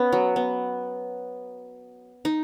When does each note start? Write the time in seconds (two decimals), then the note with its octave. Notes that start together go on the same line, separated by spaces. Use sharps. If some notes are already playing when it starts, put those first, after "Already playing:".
Already playing: B3 C#4
0.12 F#3
0.36 B3
2.25 D#4